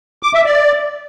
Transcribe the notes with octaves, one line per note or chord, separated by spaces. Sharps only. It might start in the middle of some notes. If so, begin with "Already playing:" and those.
D6
E5
D5